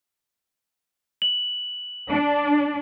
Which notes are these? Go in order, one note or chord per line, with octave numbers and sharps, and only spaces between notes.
F#7
D4